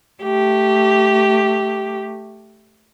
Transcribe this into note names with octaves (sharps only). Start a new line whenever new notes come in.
A3 G4